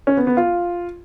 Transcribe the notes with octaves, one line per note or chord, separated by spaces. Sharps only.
C#4
B3
B3
F4